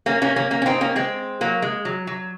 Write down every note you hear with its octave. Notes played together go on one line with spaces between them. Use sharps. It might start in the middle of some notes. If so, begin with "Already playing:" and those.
A#3 C#4
A#3 C#4
A#3 C#4
A#3 C#4
C#4
C4 D#4
A#3 C#4
G#3 C4
F#3 A#3
G#3
F#3
F#3